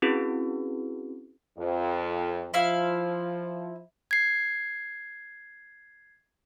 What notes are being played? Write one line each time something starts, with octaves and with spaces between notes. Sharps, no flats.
C4 C#4 E4 F#4 G#4 B4
F2
F3 E4 F5
G#6 C7